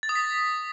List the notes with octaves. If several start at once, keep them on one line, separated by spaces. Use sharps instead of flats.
A6
D#6
B6